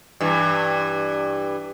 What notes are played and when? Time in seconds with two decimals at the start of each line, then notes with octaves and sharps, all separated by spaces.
0.20 G2 E3